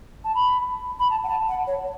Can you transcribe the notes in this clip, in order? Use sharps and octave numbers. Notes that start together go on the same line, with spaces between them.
A5
B5
B5
A5
F#5
A5
F#5
C#5